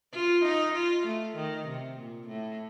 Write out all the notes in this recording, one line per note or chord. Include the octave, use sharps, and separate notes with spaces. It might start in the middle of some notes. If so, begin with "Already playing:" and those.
F4
D#4
F4
A3
D#3
C3
A#2
A2